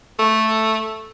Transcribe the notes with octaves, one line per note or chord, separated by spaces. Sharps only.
A3